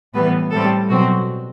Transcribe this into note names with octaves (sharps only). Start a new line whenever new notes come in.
A2 E3 G3 B3 B4
A2 G3 C4 A4
B2 F#3 C4 F#4